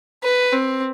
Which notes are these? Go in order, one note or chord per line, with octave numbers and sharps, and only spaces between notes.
B4
C4